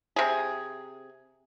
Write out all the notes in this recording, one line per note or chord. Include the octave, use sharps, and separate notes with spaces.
C3 G#4